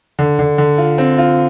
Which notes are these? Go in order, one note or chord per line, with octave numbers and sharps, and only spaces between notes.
D3
D3
D3
F4
C4
F4